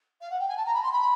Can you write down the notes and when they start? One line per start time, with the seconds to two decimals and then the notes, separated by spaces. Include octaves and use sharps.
0.21 F5
0.30 F#5
0.39 G5
0.48 G#5
0.57 A5
0.66 A#5
0.74 B5
0.83 C6
0.92 B5